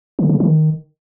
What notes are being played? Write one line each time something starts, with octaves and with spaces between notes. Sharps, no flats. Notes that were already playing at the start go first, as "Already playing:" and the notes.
D3
C#3
D#3